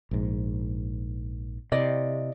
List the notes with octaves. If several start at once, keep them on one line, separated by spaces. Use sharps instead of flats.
A#1 G#2
C3 E4 D5 D#5